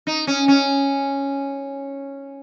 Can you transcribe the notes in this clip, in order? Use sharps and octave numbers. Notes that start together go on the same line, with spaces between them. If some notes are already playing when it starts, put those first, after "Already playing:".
D#4
C#4
C#4